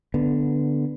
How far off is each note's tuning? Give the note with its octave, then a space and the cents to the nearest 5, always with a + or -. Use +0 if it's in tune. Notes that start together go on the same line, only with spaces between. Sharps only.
D3 +0 B3 +0